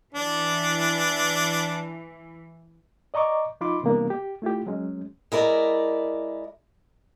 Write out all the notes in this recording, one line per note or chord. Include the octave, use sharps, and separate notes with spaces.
E3 D4
D5 D#5 A#5 C#6 D6
F3 D#4 F4 B5 C6 D6
C3 E3 G3 A#3 B3 D4
G4
A3 E4 F4 G4
F#3 G#3 C#4
G#3 E4 A#4 D5